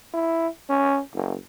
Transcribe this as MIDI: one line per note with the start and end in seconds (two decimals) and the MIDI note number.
0.14 0.47 64
0.69 0.99 61
1.15 1.34 30